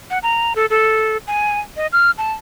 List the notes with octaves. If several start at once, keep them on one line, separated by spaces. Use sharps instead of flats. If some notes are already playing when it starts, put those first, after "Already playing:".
F#5
A#5
A4
A4
G#5
D#5
F6
A5